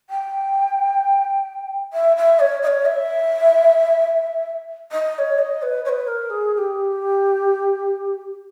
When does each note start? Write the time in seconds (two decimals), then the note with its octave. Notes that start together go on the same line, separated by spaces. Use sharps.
0.10 G5
1.93 E5
2.17 E5
2.40 C#5
2.63 D#5
2.67 C#5
2.85 E5
4.92 D#5
5.15 D#5
5.18 C#5
5.39 D#5
5.62 B4
5.85 C#5
5.89 B4
6.07 A#4
6.30 G#4
6.54 G#4
6.58 G4